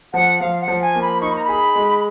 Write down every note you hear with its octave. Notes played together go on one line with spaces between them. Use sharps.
F3 F#5
F3 F5
F#5
F3
G#5
A#3
B5
D#4 C#6
B5
A#5
G#4 B5
G#3